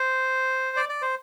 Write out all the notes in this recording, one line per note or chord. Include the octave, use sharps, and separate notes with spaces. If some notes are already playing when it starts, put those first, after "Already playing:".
Already playing: C5
D5
D5
C5